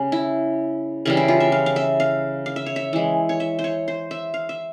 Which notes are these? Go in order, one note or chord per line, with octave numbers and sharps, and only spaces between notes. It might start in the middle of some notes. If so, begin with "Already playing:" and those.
Already playing: C#3 G3 C#4
E4
C#3 E3 G3 C#4
E4
F4
E5
F5
F5
E5
F5
F5
E5
C#5
E5
E3 G#3
C#5
E5
C5
C#5
C5
E5
F5
E5